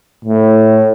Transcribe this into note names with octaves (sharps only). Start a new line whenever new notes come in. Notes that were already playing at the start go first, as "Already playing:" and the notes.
A2